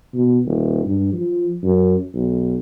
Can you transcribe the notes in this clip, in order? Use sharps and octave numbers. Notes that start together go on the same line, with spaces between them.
B2
D#1
G2
F3
F#2
B1